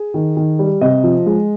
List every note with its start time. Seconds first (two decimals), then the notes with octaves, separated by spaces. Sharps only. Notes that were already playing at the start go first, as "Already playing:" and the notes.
Already playing: G#4
0.14 D#3
0.37 D#3
0.59 G3
0.81 C3 D#5
1.04 F3
1.26 G#3